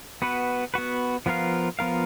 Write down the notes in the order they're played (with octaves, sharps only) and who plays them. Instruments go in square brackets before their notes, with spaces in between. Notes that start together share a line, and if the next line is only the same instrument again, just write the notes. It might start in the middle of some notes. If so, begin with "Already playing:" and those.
[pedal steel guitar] B3 F#4 B4
B3 F#4 B4
F3 B3 F4 A#4 F5
F3 B3 F4 A#4 F5